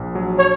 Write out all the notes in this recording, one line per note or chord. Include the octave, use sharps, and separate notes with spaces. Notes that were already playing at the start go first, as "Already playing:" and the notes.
Already playing: A#1
F#3
C#5